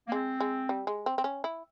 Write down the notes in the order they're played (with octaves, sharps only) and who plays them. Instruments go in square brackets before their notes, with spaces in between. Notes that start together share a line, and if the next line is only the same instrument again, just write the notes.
[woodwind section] A#3
[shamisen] G#3 [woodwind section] C4
[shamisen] G#3
G3
G#3
C4
C4
C#4
E4